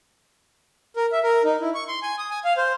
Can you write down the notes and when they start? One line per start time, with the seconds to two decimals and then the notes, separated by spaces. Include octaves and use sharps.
0.96 A#4
1.12 E5
1.23 A#4
1.44 D#4
1.61 E4
1.74 C#6
1.88 C6
2.03 G#5
2.18 D#6
2.31 G#5
2.45 F5
2.57 C5